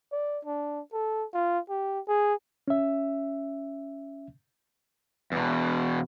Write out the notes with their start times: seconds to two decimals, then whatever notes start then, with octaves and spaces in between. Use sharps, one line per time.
0.12 D5
0.45 D4
0.93 A4
1.34 F4
1.69 G4
2.08 G#4
2.68 C#4 E5
5.32 E2 B2